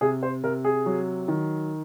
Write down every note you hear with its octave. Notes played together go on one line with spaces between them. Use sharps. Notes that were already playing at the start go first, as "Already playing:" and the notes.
C3 G#4
C5
C3 A#4
G#4
F#3
D#3